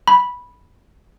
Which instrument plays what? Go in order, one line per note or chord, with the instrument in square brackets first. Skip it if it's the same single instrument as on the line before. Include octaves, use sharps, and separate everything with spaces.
[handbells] B5